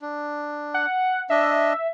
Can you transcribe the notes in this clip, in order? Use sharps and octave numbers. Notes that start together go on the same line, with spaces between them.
D4
F#5
D4 D#5 E5